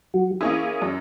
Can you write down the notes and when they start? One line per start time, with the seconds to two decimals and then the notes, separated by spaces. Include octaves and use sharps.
0.14 F#3 F#4
0.41 A#3 C#4 E4 G#4 D#6
0.82 F#2